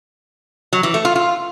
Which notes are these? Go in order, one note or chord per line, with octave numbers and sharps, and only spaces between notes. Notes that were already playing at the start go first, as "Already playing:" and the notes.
F#3
E3
A3
F4
F4